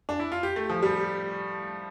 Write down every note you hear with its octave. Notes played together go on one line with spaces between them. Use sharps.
D4
E4
F4
G4
A3
F3
G3